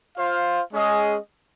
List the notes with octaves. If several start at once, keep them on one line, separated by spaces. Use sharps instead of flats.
F4 C5 F5
G#3 C#4 G#4 D#5